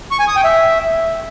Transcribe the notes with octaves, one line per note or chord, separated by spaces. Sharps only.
C#6
G#5
D#6
G5
E5